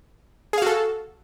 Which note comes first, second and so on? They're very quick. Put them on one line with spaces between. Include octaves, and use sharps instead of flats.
G#4 F5 F#4 A4